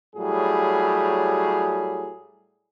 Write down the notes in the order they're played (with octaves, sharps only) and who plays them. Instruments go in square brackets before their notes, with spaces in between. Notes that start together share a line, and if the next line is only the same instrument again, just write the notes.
[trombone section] A2 F#3 G3 G#4